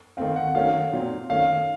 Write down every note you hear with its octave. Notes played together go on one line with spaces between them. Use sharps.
D#3 A3 C4 F5
F#5
F#5
D#3 F#3 A3 C#4 F5
A#2 F#3 C4
D#3 A3 C#4 F5